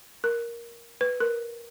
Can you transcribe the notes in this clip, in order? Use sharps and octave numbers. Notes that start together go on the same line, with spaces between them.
A#4
B4
A#4